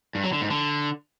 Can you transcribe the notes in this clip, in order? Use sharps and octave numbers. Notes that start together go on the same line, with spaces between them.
G2
F#3
D3
G#2
D3